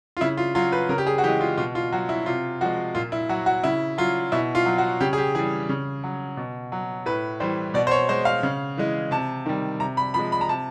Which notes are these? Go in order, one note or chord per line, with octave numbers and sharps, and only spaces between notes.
F4
C#3 E4
F4
F#3 F4
B4
C#3 A#4
G4
G#4
F#4
E3 G#3 G4
F4
B2 F4
F4
F#3 F#4
E4
C3 F4
F3 G#3 F#4
A#2 F4
E4
F#3 F#4
F#4
C#3 E4
F#3 F4
B2 E4
F4
F#3
F#4
C#3 G4
G#4
G4
E3 G3 G#4
C#3
F#3
B2
F#3
A2 B4
E3 G3 C5
B2 D5
C5
C#5
G#3 C5
F5
C#3
E3 G#3
C3 A5
D#3 G3
C3 A#5
B5
F3 G#3 B5
B5
A#5
C3 A5